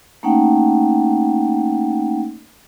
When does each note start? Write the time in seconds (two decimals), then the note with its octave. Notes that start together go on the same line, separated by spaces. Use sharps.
0.23 A3 A#3 C#4 D#4 F#5 G5